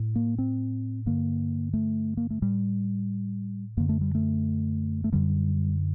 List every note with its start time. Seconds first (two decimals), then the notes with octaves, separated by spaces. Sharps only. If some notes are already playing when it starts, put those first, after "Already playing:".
Already playing: A2
0.16 A#3
0.38 C4
1.06 G2 D3 A#3
1.73 A3
2.17 A#3
2.30 A3
2.42 A2 G3
3.77 F#2 D3 A#3
3.89 A3
4.01 G3
4.15 A3
5.04 A3
5.12 F#2 D3 G3